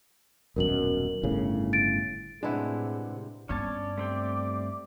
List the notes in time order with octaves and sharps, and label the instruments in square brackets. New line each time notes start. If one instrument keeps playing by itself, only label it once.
[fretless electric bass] D#1 F#2 B2 [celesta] A#4 F#7
[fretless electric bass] G1 A2 C#3
[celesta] A6 D7
[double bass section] A2 C3 [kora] G#3 E4 [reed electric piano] D4 B4 F#5 [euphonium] G#4
[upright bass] G2 B3 [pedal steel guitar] C#4 C#5 A5 [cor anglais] D5
[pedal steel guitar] A3 C4 G4